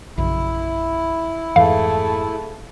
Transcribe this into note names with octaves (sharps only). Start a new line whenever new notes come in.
A#1 F#2 C#3 E4
F2 G#2 E3 A3 G#4 F5